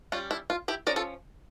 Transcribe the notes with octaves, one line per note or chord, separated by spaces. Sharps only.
G3 C#4 F4
E4
F4
E4 G4
F3 C#4 A#4 D5
F4 A4